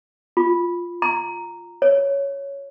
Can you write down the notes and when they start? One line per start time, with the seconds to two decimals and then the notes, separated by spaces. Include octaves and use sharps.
0.37 F4
1.02 A#5
1.82 C#5